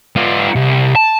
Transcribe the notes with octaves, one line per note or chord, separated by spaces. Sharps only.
B3 F4
C2
A5